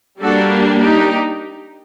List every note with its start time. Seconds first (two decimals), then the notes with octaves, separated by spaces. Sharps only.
0.22 G3 A#3 D4 F#4 A4
0.81 D#4 G4